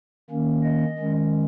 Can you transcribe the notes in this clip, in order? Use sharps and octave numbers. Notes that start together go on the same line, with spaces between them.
D#3 A#3 C#4
D#5
D#3 G#3 C#4